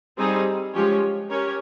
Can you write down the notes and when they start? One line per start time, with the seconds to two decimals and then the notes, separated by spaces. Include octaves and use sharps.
0.18 G3 C4 D#4 G#4
0.74 F3 G#3 C#4 G4 C#5
1.30 C#4 G4 A#4 C#5